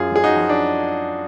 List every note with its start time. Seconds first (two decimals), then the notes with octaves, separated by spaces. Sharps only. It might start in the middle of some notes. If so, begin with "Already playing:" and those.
Already playing: F#2 F4 G#4
0.12 F#2 G#4
0.24 D#4 F#4
0.36 F3
0.49 D4